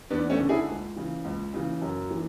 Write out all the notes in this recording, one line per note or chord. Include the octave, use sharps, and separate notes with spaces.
E2 B3 D4
A3 C#4
D3
E4 G#4
C#2
C#3 E3
C#2
C#3 E3
F#2
E3